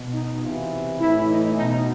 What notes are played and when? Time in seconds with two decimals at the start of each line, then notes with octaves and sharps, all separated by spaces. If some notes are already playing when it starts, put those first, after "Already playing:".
Already playing: B2
0.14 D#4
0.42 C3 E3 F4
1.00 A2 E3 E4
1.28 D#4
1.57 B2 D#4